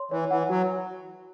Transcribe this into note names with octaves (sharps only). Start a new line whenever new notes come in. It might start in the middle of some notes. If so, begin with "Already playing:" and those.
Already playing: C#5 C6
E3 C#5
E3 F#5
F#3 F#4